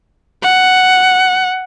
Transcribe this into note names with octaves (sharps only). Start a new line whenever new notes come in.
F#5